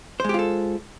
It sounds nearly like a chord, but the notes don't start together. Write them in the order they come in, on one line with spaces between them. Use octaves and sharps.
C5 G#3 G4 F4 A4